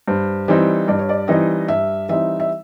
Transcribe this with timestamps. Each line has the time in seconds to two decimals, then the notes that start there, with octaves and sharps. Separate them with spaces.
0.08 G2 C5
0.48 E3 G3 C4 D#4
0.88 G2 D5
0.99 C#5
1.09 D5
1.28 E3 G3 C4 D#4 D#5
1.68 G2 E5
2.09 E3 G3 C4 D#4 E5
2.40 E5